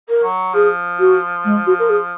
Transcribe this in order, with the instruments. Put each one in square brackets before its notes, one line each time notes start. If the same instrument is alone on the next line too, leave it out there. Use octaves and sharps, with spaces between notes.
[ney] A#4
[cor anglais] F#3
[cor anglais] F3 [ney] G#4
[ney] F#4
G#3
F#4
A#4
G#4